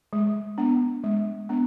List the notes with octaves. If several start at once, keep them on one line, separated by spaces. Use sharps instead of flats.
G#3
B3 D4
G#3
B3 D4